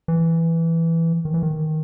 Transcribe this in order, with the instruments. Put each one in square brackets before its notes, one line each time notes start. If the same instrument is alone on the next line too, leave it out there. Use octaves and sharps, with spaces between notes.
[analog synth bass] E3
D#3
E3
D#3